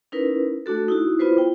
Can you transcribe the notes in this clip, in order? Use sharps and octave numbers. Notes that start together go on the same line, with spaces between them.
C#4 D#4 E4 A#4 B4
A3 D4 F#4 A4
D#4 E4 F#4
B3 E4 F4 B4 C5
G5